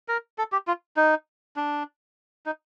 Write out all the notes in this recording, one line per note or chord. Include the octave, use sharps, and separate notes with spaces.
A#4
A4
G4
F4
D#4
D4
D#4